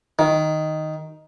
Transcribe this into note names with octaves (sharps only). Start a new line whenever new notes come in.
D#3